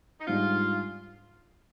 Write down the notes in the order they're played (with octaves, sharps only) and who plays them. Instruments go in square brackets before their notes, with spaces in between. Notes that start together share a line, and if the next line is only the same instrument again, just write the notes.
[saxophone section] D#4
[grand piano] G#2 G3 D4 [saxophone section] F4